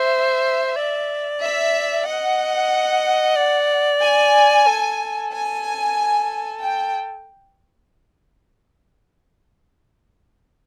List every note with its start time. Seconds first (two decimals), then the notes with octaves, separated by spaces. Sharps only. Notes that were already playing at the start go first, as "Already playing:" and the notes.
Already playing: C5 E5
0.76 D5
1.42 E5
2.06 D#5 F#5
3.36 D5
4.02 G#5
4.67 A4
5.32 G#5
6.63 G5